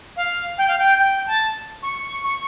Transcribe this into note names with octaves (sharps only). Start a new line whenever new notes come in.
F5
G5
F5
G5
G5
A5
C#6
C#6